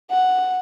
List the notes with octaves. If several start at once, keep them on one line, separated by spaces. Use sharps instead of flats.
F#5